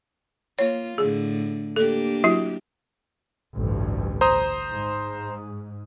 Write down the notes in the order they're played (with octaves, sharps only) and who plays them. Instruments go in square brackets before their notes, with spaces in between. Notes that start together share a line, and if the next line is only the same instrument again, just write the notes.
[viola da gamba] A#3 F4 [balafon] C#5
[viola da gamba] A2 D3 [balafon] G#4
[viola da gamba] A#3 D4 G4 [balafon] A4
[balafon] F#3 E4 F#4
[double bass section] A1 D2 G2
[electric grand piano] C5 A#5 D#6
[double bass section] G#2